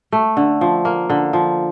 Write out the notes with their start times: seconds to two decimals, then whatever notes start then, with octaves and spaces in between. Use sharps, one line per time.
0.12 A3
0.37 D3
0.61 F3
0.85 A#3
1.10 D3
1.33 F3